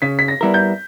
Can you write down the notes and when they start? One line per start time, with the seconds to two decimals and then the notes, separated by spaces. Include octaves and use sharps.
0.02 C#3 B6
0.19 B6
0.28 A#6
0.41 G3 B3 E4 A#4
0.54 G6